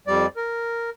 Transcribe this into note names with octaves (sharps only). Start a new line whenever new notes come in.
F2 G3 D5
A#4